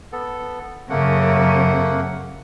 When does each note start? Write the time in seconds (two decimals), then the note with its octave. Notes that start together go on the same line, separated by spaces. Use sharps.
0.12 B3 A4
0.90 F#2 C#3 A3 A#3 F#5